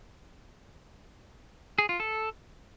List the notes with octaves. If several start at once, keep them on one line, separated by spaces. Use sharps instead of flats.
G#4
F4
A4